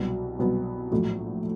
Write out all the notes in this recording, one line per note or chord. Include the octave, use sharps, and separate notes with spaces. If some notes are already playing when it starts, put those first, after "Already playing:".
Already playing: C2 B2 F#3 B3
C2 B2 F#3 B3
A#1 A2 F#3 A3